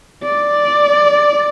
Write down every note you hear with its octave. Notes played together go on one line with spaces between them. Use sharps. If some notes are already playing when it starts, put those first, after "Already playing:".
D5